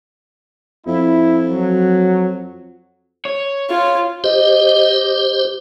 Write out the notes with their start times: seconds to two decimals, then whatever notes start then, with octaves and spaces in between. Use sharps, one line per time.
0.87 F2 E4
1.50 F#3
3.25 C#5
3.70 F4
4.24 G4 C5 D#5